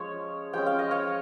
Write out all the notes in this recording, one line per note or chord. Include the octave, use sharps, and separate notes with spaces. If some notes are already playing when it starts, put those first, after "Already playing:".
Already playing: F3 G#3 C#4 C#5
F3 G#3 C#4 G5
F5
D#5
C#5 F5